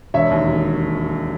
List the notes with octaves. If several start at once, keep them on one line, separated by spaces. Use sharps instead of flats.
E1 C#5 E5
D#2
E1